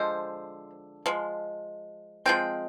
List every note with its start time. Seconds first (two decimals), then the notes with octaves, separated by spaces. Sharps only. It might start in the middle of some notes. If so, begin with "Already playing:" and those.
Already playing: D3 F3 G#3 C5
1.06 F3 G#3
2.26 F3 G#3 C4 G5